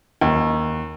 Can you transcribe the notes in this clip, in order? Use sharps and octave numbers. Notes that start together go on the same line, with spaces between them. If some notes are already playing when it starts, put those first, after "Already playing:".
D#2